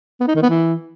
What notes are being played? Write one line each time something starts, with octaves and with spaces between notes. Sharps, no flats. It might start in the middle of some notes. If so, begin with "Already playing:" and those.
B3
D#4
D#3
B3
E3